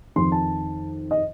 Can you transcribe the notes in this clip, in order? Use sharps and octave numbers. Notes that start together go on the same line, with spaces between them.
F2 D#3 C6
A5
D#5